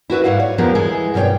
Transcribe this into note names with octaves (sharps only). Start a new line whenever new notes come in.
E4 F#4 B4 E5
G#2 G3 E4 F5 F#5
C#5
F2 F3 G#3 B3 G4 A#4
E3 G#3 E4 G#4
G2 B2 B4 C#5 G5